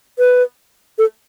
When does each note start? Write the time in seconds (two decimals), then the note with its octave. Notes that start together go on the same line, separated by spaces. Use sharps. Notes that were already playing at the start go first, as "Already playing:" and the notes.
0.19 B4
0.98 A4